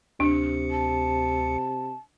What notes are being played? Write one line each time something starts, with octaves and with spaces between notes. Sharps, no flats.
D2 C3 D4 C#7
A5